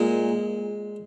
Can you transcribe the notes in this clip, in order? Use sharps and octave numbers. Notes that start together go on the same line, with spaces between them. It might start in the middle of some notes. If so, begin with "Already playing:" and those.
Already playing: A#2 G#3